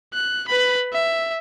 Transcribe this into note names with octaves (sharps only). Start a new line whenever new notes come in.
F#6
B4 B5
E5